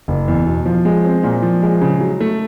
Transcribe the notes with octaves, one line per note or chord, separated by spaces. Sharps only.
F#1
E2
B2
F3
G#3
C4
A#2
F3
G#3
C#3
F#3
A3